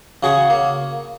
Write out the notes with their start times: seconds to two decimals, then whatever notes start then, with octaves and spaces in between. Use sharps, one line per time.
0.23 C#3 F#4 G#4 C#6
0.50 A#3